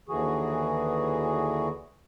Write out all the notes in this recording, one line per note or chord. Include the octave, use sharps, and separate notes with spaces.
D#2 D3 E3 F#4 G#4